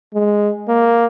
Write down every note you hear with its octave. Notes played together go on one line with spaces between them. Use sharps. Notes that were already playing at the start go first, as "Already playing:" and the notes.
G#3
A#3